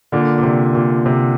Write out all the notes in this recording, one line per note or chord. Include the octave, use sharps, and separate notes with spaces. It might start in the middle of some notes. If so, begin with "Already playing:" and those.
A#2 D3
A#2
C3
A#2
C3